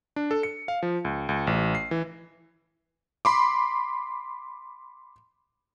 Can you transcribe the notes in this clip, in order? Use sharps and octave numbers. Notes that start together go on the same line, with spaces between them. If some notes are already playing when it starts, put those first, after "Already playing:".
D4
A4
C#7
F5
F3
C#2
C#2
A1
C7
E3
B5 C6 D6